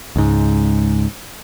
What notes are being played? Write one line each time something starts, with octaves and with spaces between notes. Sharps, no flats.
C#2 G#2